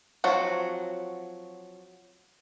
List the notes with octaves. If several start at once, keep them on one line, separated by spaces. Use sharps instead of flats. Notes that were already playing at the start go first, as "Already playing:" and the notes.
F3 F#3 C4 F#4